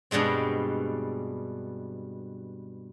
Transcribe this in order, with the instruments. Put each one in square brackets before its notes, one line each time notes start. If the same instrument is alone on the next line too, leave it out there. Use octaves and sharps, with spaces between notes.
[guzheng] G2 B2 G3 G#3 C4